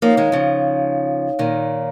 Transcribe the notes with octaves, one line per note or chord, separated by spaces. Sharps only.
F3 A#3 D#4 C#5 F5
D#3 G#3
C#3 F3
A#2 D#3